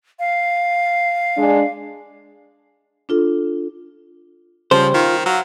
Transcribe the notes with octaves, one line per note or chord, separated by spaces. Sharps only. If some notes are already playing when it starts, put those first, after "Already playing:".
F5
G#3 D4
D4 F4 A4
C#3 F3 G3 C5
D#3 F4
F#3 F5